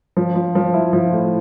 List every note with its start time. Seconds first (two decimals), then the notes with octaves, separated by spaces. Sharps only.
0.17 F3
0.36 F3
0.55 F3
0.74 E4
0.93 F3
1.12 A2